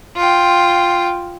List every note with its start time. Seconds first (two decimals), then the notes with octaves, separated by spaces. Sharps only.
0.16 F4 G5